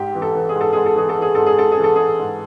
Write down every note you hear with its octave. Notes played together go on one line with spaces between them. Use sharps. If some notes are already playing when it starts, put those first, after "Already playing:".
Already playing: G#2 G4
E3
A4
E3
G#4
G#2
A4
G#2 G#4
A4
E3 G#4
A4
E3
G#4
G#2 A4
G#4
G#2 A4
G#4
E3
A4
E3 G#4
G#2